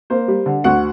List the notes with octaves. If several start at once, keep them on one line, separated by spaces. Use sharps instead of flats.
A#3 C5
G3
D3
D2 F#4 F#5